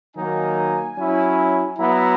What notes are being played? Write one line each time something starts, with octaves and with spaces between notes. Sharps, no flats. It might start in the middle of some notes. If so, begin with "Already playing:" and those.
D#3 F#3 A#3 D#4 G#5
F#3 C#4 E4
F#3 B3 E4 A#5